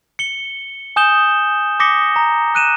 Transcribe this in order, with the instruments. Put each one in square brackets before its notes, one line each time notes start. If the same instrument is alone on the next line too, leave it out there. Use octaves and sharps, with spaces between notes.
[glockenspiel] C#7 G7
G#5 D#6 G6 E7 G7
D6 D#6 A#6 B6 C#7 G7
A#5
F#6 D#7 E7